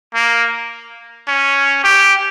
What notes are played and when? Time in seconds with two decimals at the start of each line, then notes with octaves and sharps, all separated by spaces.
0.15 A#3
1.28 C#4
1.84 G4